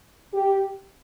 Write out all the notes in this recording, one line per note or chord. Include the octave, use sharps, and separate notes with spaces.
G4